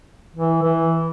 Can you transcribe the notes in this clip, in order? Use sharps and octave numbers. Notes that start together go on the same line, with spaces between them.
E3
E3